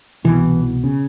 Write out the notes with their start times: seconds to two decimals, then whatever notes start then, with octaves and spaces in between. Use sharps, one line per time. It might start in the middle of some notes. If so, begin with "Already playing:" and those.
0.24 C2 B2 E3
0.84 C#3